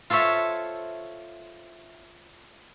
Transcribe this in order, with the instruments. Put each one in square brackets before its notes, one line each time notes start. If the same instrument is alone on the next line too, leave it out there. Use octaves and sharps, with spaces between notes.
[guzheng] F4 A4 C5 C#5 E5